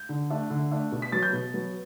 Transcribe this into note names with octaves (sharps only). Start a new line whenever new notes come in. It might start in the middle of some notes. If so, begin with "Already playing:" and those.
Already playing: G6
D3
A3 D4
D3
A3 D4
B2
B6
F#3 B3 A6
G6
B2
F#3 B3